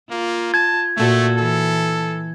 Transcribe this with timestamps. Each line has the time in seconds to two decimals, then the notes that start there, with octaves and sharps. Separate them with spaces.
0.11 A#3 F4
0.54 A5 G#6
0.97 A#2 A3 F#4 A4
1.38 E3 A4